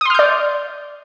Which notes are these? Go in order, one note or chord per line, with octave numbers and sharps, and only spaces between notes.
D5 C6 D#6 F6 G6